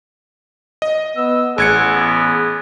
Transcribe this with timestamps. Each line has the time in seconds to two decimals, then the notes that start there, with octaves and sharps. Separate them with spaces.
0.82 D#5
1.17 B3 E6
1.58 A1 G#4 F#5 G#6 C#7
1.93 B3